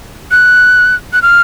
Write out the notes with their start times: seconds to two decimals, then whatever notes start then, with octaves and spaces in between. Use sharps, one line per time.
0.31 F#6
1.13 F#6
1.22 F6